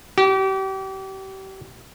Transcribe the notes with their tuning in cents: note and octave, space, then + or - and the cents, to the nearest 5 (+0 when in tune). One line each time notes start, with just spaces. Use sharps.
G4 -35